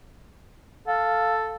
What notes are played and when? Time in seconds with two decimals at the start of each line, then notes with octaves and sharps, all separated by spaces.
0.88 A4 F5